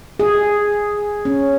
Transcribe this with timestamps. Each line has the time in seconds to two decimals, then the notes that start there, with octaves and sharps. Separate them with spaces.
0.20 G#4
1.25 C#4